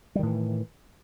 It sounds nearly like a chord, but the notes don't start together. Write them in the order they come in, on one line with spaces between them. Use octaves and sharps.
G3 D#3 A2 E3